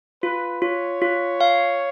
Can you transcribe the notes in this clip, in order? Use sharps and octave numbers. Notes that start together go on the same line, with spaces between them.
F4 B4
F4 C#5
F4
F5